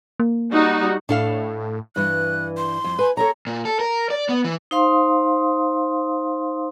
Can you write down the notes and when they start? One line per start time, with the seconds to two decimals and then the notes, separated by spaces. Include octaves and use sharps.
0.20 A#3
0.52 G3 D#4 F#4
1.09 A2 D4 A4 F5
1.96 G2 E3 F#6
2.57 C6
2.84 F2
2.99 B4 G#5
3.17 A4 A#4 C#5 A#5
3.47 A#2
3.65 A4
3.80 A#4
4.10 D5
4.29 B3
4.44 E3
4.71 D#4 C5 F5 C6 D#6